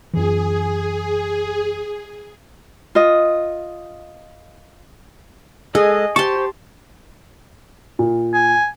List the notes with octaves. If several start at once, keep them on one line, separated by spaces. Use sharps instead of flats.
F#2 E3 G#4
F4 D#5
G#3 G#4 A4 D#5
G4 C5 A5 C6 C#6
A#2
G#5